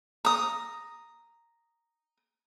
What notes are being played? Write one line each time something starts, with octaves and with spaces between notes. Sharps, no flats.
A#5 D#6